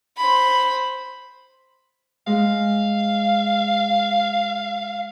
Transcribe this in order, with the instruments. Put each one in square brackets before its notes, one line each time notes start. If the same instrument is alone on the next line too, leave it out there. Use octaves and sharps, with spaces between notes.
[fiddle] C5 B5
[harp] G#3 [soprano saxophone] F5